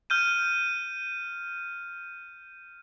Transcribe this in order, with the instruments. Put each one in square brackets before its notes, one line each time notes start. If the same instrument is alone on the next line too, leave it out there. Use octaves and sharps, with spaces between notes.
[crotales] F6 G6 D#7